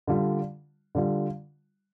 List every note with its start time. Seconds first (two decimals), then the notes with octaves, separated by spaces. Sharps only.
0.07 D3 G3 F4
0.95 D3 G3 F4